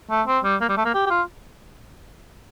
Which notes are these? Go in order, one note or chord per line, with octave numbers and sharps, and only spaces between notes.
A3
C4
G3
A#3
G3
A3
A#3
G4
G4
F4